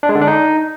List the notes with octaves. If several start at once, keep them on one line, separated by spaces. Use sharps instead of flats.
D4
G#3
D3
D4
D#4